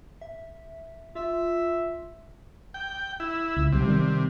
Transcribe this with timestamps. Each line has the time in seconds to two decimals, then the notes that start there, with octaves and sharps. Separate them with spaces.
0.21 E5
1.15 F4 E5
2.74 G5
3.20 E4
3.56 C#2
3.72 B1 C3 G3
3.87 D#3 G3 C4